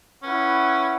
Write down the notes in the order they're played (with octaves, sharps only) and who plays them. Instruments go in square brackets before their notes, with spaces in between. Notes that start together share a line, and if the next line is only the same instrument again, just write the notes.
[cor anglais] C#4 [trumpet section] E4 B4 F#5